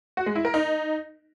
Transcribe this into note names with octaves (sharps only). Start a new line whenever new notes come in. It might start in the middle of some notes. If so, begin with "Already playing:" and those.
F#4
G#3
E4
A#4
D#4